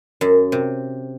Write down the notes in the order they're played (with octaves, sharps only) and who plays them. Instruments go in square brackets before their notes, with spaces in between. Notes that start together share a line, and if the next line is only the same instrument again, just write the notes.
[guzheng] F#2
C3